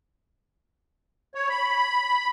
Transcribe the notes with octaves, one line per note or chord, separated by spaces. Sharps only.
C#5
B5